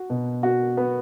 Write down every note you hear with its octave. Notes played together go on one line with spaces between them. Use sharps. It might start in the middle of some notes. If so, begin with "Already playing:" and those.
Already playing: F#4
B2
F#4
B3